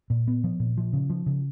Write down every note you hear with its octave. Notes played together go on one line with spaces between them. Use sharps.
A#2
B3
F3
A#2
F3
C#3
F3
C#3